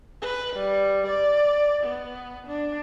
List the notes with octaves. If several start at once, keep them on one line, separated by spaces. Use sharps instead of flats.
B4
G3
D5
B3
D4